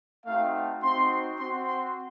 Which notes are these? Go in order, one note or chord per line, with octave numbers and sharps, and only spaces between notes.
A3 C4 D#4 F#4 F5
C4 D#4 F#4 C6
C4 F#4 C6
C6